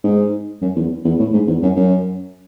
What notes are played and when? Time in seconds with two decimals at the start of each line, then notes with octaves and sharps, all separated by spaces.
0.04 G#2
0.62 F#2
0.76 E2
1.05 E2
1.19 A2
1.33 G#2
1.48 E2
1.63 F#2
1.76 F#2